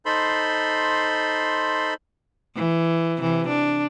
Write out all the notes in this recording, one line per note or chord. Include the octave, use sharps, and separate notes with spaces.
D#4 A4 C5 B5 C6
E3
C3 E3
D4